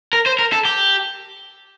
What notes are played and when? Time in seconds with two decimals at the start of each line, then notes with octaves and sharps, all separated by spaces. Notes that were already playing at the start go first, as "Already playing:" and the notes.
0.13 A#4
0.26 C5
0.39 A#4
0.53 A4
0.65 G4